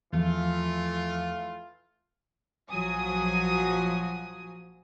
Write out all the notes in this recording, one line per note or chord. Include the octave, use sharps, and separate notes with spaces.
E2 E3 F3 A3 F4
A#1 F3 F#3 F#4 G#5 D#6